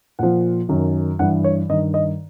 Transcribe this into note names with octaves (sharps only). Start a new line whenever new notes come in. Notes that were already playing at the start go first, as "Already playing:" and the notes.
A#2 F3 F#5
F#2 D#3
G2 E3 F#5
C#5
G2 D#3 D#5
D#5